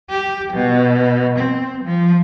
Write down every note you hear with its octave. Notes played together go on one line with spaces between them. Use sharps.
G4
B2
C4
F3